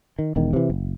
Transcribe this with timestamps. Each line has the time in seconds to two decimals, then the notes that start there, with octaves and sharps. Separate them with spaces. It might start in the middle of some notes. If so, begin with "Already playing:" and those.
0.19 D#3
0.36 E1 E2 D#3
0.53 C3 E3
0.70 F#1